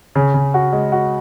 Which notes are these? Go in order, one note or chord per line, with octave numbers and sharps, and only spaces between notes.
C#3
C#3
F#4
G#3
F#4